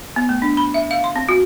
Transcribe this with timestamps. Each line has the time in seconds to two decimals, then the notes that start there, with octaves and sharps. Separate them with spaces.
0.16 B3
0.29 A3
0.42 D4
0.57 B5
0.74 E5
0.91 F5
1.04 C6
1.16 C4
1.29 F#4